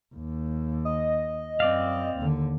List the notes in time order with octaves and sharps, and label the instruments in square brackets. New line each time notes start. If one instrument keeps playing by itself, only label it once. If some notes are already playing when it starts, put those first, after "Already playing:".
[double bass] D#2
[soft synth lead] D#5
[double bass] F#2 [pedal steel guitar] C4 D5 F5
[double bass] D#2 D3